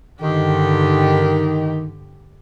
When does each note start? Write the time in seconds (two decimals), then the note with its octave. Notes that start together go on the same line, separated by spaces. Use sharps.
0.21 G2 D3 D#3 G4